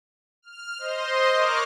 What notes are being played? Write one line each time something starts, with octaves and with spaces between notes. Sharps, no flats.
F6
C5 D#5 C6
A#4 C#5 D6 F6 F#6